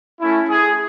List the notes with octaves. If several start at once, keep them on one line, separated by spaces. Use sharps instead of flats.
A3 C#4 E4
G#4